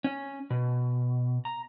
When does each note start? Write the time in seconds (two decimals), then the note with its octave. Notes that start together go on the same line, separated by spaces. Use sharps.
0.04 C#4
0.50 B2
1.45 A#5